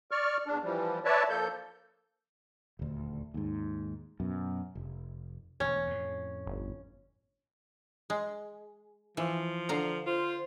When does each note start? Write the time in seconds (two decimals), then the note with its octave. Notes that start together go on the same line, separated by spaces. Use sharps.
0.11 D5 C#6 F6
0.47 E2 D4
0.63 E3 F3 G3
1.05 B4 C#5 D5 E5 A5
1.30 F3 A#3 A4 G6
2.79 D#1 D2
3.34 D#2 G#2
4.20 F#2 B2
4.75 F1
5.60 E1 D2 C#4
5.87 F2 A2
6.47 G1
8.10 G#3
9.17 E3 F3
9.69 D3 F5 A#5
10.06 F4 C5